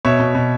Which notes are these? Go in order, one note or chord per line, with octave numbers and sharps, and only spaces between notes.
B2 C#5 E5
B2
B2